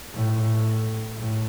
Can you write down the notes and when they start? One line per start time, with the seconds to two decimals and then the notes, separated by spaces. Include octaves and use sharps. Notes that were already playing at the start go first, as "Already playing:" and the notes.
0.14 A2
1.18 A2